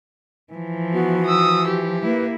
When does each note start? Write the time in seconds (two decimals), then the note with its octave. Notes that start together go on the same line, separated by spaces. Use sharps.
0.53 E3 F3
0.93 B3 F#4
1.26 D#6 E6
1.67 G4
2.05 A#3 E4 B4